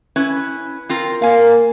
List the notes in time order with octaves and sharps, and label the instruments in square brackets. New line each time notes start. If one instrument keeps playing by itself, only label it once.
[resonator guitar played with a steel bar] C#4 E4 B4
C4 F4 A#4
[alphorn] A#3 [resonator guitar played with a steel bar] F5 G#5